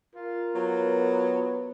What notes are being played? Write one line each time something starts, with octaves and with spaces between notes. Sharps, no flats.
F4 A#4
F#3 B3